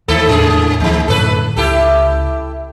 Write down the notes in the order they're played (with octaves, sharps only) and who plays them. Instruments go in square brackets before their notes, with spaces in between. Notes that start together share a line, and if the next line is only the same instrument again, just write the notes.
[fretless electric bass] D#2 [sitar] D#3 A3 A4
[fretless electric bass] E2 A2 G#3 [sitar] C#3 G#4
[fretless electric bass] D2 F3 A#3 [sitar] D#3 G#3
[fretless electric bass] F#2 A2 D3 [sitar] A4 B4
[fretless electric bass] C#2 [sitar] E4 G4 A4